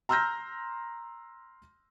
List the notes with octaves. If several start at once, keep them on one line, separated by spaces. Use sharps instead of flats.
A#5 C6 E6 F6 G6 A#6